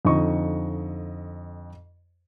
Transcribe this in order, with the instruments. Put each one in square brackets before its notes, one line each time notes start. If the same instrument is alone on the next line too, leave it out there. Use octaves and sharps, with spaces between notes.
[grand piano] F2 D3 D#4 D#5 C#6